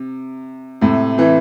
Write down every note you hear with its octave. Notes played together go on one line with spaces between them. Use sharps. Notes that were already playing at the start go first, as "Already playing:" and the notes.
Already playing: C3
A2 C3
C3 E3